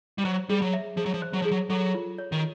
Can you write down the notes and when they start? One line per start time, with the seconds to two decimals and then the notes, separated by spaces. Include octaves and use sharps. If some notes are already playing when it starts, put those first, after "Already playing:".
0.18 G3
0.25 F#3 C5
0.49 G3 G#4
0.62 F#3
0.73 E5
0.97 F3 G#4
1.06 F#3
1.14 F3
1.22 C5
1.33 F#3
1.42 F3 G#4
1.51 F#3
1.70 F#3 A4
1.95 F4
2.18 C#5
2.32 D#3